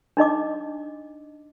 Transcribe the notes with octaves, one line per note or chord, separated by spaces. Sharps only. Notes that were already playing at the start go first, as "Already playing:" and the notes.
D4 D#4 D#5 D6